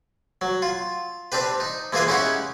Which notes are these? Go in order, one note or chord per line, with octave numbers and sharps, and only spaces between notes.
F#3
F4
C4 D4 G4 B4
D#4
E3 G#3 A#3 F4 G#4 B4
G#3 C#4 D#4 E4 G4 F#5